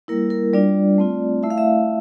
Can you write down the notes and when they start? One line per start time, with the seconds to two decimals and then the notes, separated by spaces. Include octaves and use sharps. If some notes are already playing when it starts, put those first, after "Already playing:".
0.08 G3 A#3 E4 A#4
0.30 A#4
0.53 G3 D4 F4 D5
0.98 A3 C4 F4
1.43 A3 E4 E5
1.50 F5
1.58 E5